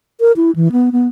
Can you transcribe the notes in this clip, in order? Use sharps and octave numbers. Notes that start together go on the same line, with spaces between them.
A#4
E4
E3
B3
B3